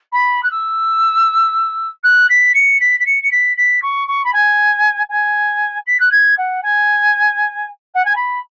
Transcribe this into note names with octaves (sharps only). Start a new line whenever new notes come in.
B5
F#6
E6
F#6
B6
C#7
B6
B6
C#7
C#7
B6
B6
C#6
C#6
B5
G#5
G#5
B6
F#6
G#6
F#5
G#5
F#5
G#5
B5